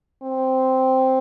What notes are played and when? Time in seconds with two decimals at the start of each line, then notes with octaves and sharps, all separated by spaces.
0.22 C4